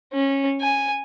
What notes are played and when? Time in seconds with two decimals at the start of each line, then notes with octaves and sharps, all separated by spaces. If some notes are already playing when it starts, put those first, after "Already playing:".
0.13 C#4
0.61 G#5